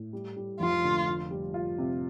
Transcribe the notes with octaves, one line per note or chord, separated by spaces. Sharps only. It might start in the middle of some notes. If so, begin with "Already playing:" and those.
Already playing: A2
G3
G3
F1 F4
D3
F4
G3
F4
C3